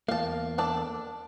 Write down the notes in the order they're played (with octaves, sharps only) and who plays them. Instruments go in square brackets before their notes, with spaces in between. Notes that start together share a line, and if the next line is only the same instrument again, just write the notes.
[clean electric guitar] E2 A#3 [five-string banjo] F5 A5
[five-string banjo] D4 A4 D5